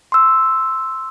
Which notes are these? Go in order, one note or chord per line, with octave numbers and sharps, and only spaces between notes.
C6 E6